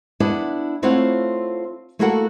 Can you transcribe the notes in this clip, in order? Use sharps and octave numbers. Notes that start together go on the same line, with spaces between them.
B3 D4 E4 F#5 A5
A3 C4 E4 F4 C#5 F#5
A3 A#3 E4 F#4 A4 F#5